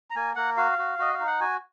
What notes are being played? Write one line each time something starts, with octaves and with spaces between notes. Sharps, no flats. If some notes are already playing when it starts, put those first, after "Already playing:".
A#5
A#3 G#5
A#3 F#5
F#4 F5
F#4
F#4 D#5
F5
D#4
F#5
F#4 G#5